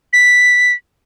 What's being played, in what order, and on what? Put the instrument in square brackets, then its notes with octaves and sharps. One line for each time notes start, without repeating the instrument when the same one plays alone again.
[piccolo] B6